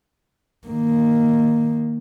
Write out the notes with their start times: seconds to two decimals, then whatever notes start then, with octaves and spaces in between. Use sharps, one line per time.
0.67 D#3 A#3